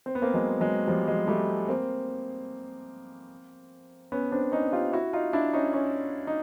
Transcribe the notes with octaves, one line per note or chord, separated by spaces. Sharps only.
C4
B3
A#3 C4
F#3 G#3
F#3 G#3
F3 G3
F#3 G#3
G3 A3
A#3 C4
B3 C#4
C4 D4
C#4 D#4
F4 G4
E4 F#4
D#4 F4
D4 E4
C#4 D#4
C#4 D#4
D#4